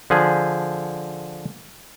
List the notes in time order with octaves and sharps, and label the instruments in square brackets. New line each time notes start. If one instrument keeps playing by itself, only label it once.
[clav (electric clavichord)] D3 F3 G#4